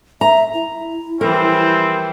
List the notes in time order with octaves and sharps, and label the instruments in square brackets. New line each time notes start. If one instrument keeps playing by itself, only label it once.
[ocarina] E5 [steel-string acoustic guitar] A#5
[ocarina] E4
[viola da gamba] E3 F3 G3 [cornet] C4 [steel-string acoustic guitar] A#4